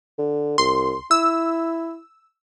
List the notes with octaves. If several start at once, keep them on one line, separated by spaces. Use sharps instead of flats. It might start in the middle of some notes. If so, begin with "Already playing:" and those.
D3
C2 C6
E4 E6